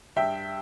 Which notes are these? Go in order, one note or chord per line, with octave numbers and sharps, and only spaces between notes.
G2 E5 G5